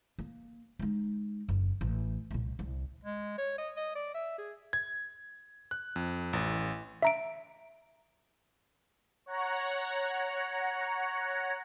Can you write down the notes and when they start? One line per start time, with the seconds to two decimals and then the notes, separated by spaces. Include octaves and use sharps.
0.19 A#3
0.79 G#3 D#4
1.49 F#1
1.81 A1
2.31 C2 A#2
2.59 C2
3.04 G#3
3.38 C#5
3.58 D#5
3.77 D#5
3.95 D5
4.15 E5
4.38 G#4
4.73 G#6
5.71 F#6
5.96 F2
6.33 A1
7.03 E5 A#5 D7
9.26 C#5 F#5 A#5